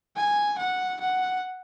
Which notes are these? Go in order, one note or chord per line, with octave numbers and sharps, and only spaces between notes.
G#5
F#5
F#5